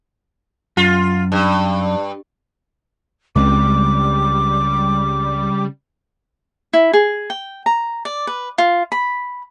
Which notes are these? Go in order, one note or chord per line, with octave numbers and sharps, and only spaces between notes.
F#2 F4
G2
C#2 C#3 G3 G#3 C4 D6
E4
G#4
G5
A#5
D5
B4
F4
B5